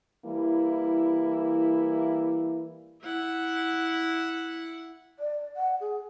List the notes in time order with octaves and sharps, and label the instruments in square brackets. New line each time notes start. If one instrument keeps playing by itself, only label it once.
[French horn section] E3 G3 A#3 E4
[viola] E4 F#5
[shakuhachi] D5
F#5
G#4